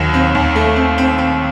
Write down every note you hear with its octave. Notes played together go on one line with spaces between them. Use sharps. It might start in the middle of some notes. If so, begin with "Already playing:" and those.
Already playing: D#2 D#3 F#3
C4
D#2
A3
C4
C4
C4